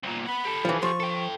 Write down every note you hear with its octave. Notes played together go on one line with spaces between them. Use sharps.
C2 A#2
B4 F#5 B5
G4 A4
E3 F3
F3 C#6
A4 G5